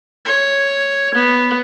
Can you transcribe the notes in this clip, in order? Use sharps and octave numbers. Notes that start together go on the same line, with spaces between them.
C#5
B3